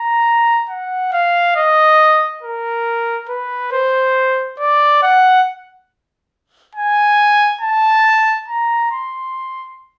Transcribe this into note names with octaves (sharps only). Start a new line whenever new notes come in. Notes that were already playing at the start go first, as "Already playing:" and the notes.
Already playing: A#5
F#5
F5
D#5
A#4
B4
C5
D5
F#5
G#5
A5
A#5
C6